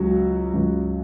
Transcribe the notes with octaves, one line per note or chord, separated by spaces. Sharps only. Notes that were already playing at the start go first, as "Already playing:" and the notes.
Already playing: C#2 C#3 F#3 F#4
C#2 C#3 F#3